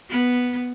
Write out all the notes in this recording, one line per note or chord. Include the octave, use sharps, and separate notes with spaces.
B3